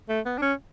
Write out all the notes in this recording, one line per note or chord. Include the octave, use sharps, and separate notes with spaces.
A3
B3
D4
C#4